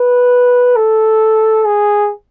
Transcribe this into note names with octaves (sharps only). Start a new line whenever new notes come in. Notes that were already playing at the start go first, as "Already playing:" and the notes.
Already playing: B4
A4
G#4